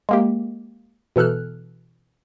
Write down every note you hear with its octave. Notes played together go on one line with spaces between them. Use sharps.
G#3 A#3 G4
B2 E3 A4 F6 F#6